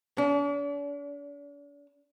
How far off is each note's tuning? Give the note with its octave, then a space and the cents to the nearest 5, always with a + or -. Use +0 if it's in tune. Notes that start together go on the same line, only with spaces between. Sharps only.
D4 -45